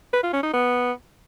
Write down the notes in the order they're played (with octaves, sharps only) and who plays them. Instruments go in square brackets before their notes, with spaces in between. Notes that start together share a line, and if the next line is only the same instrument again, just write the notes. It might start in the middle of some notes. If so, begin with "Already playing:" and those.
[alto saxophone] B4
F4
C#4
D#4
B3